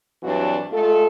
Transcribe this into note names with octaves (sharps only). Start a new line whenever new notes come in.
G2 E3 F#3 C4 D4 F#4
G#3 A3 F4 A4